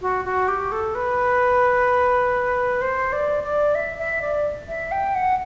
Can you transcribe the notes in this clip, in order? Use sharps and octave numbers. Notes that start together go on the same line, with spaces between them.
F#4
F#4
G4
A4
B4
C5
D5
D5
E5
E5
D5
E5
G5
F#5